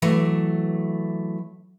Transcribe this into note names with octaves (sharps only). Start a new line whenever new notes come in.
E3 F#3 A3